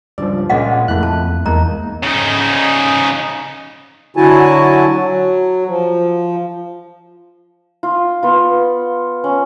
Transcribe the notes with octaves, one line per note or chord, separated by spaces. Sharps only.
C#2 G2 F3 D5
A#2 C#3 G#3 A#3 D#5 F5 F#5
F2 A3 A#3 E4 F#6
A5
E2 G#3 A#3 D#4 A#5
C#3 D#4
D3 F#3 E4 F#4 G#5 A5
F#3
F3
F4
B3 F4
C#4